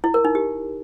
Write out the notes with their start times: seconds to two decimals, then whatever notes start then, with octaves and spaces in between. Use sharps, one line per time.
0.04 E4
0.14 A#4
0.25 D#4
0.35 G4